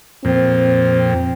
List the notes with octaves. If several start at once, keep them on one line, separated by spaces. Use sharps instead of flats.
F2 A#2 C4